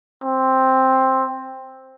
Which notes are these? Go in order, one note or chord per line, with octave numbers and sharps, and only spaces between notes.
C4